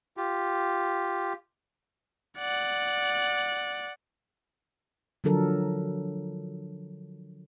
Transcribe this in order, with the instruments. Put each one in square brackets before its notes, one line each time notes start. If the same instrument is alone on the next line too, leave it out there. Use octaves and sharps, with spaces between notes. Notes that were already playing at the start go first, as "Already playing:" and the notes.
[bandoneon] F4 G4
[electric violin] D5 F#5
[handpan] D3 F3 F#3 D4 A4 A#4